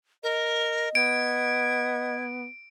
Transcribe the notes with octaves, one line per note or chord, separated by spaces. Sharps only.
A#4 D#5
B3 G#6 D7